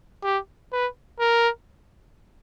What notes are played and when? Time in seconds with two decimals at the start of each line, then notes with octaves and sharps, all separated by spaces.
0.23 G4
0.72 B4
1.20 A#4